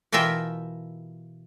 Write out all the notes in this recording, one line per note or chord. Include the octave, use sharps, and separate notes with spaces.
B2 E3 F4 A#4 E5 G5